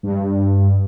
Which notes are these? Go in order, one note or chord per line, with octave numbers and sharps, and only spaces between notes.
G2